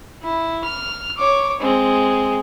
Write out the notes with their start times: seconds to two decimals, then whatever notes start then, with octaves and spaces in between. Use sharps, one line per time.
0.23 E4
0.64 F6
1.17 C#5 D6
1.60 G#3 C4